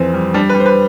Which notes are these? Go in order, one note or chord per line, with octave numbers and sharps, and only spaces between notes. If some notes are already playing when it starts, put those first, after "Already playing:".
Already playing: F2 E3 C4
G3
G3 D4
B4
G3
C5
B4